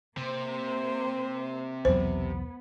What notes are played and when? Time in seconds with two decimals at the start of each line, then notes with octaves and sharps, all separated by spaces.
0.17 C3 A#3 C5
1.85 B1 E2 F#3 B3 C5